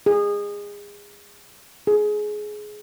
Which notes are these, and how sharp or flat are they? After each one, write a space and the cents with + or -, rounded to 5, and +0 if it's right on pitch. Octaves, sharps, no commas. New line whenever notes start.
G#4 -25
G#4 +15